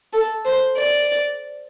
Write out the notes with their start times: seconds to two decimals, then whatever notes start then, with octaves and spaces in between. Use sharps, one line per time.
0.13 A4
0.45 C5
0.76 D5